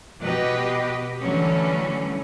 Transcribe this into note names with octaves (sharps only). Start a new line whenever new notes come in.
B2 G4 B4 D#5
D3 E3 F#3 G3 A3 C#4